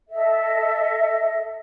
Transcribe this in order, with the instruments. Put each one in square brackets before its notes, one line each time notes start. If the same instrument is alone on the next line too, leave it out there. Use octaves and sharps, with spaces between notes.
[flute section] A4 D#5 E5